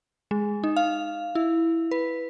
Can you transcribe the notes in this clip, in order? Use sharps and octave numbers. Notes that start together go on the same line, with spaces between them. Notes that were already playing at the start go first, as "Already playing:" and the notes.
G#3
D#4
F5
E4
B4